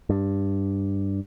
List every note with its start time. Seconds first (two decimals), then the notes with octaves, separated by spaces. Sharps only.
0.09 G2